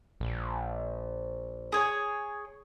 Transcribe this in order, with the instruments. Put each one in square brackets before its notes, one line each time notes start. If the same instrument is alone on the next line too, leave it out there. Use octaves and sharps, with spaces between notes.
[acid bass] A#1
[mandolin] G#4 C#5